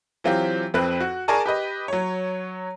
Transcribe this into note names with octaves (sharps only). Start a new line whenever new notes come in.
E3 F#3 C4 F4 G4
F2 C4 B4 F#6
F#4
G#4 A#4 D5 G#5 A5 C#6
G4 B4 D#5
F#3 C#5